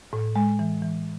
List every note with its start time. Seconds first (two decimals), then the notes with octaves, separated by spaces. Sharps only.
0.13 A2
0.36 G#3
0.59 E3
0.82 E3